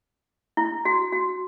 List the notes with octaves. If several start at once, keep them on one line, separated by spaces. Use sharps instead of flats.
E4
F#4
F#4